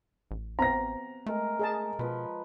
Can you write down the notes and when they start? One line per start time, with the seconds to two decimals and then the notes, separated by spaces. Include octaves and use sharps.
0.31 A1
0.59 B3 C4 F5 A#5 A#6
1.26 G#3 A3 A#4 G#5
1.59 G#4 D#5 A5
1.99 B2 F3 B4